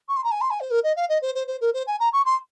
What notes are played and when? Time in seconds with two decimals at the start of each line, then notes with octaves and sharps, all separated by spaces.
0.08 C#6
0.16 C6
0.24 A#5
0.31 G#5
0.41 C6
0.50 G#5
0.60 C5
0.70 A#4
0.83 D#5
0.96 F5
1.09 D#5
1.21 C5
1.35 C5
1.47 C5
1.61 A#4
1.73 C5
1.87 G#5
1.99 A#5
2.13 C#6
2.25 C6